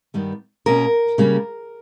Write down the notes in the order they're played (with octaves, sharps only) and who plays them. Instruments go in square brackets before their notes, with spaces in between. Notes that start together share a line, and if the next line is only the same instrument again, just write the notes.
[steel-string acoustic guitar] G2 D#3 G3 B3
B2 A#3 C#4 A#4
C#3 G3 A#3 C#4